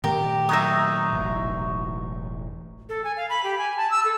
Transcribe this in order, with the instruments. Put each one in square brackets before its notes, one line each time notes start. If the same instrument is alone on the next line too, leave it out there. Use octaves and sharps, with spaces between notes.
[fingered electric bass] A#2 D#3 A3 [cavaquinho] G4 A#4
[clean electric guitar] F#3 D#4 [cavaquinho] E5 A#5 D#6
[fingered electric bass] E1 A1
[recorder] A4
G#5
F5
B5
G4
G#5
A5
E6
A4